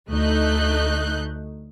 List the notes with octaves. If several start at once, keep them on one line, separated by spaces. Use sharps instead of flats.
D2 A3 D#4 F#6 G6